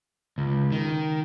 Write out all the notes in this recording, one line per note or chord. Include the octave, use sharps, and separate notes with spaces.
C#2
D#3